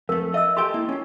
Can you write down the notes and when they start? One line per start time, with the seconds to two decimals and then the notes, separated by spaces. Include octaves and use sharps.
0.09 F2 A3 A#4
0.34 D#5 E5 E6
0.57 G4 A4 G5 C6
0.74 A#3 E4
0.89 C#4 F4